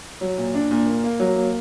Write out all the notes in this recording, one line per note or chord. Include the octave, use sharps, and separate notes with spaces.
F#3
A#2
D4
A#2
A#3
A#3
F#3
A#3